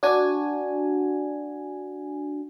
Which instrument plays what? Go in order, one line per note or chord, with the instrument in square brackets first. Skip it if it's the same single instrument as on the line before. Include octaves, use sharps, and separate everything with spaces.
[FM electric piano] D4 F#4 G#5